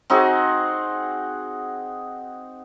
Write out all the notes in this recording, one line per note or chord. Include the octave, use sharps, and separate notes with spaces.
C4 D#4 F#4 G#4